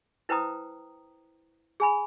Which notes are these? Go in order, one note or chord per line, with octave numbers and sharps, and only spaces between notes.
E4 B4 C5 G5 A#5 D#6
G#4 G#5 B5